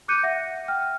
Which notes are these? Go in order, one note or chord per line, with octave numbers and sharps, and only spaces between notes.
D6 F#6 G6 C#7 D#7
E5 F#5 A#6
G5 F6